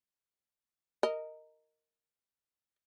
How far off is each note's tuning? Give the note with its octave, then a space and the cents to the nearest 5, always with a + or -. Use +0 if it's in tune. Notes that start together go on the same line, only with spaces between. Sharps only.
A#4 -10 D#5 +0